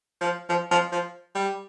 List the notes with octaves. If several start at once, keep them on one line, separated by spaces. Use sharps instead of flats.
F3
F3
F3
F3
G3